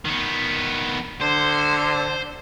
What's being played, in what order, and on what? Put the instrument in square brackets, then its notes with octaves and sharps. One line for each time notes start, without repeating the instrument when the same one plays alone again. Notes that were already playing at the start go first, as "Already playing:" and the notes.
[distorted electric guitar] D#3 B3
[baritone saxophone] D3 [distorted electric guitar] C5